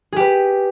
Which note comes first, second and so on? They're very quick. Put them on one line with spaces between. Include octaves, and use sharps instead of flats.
G#4 G4 B4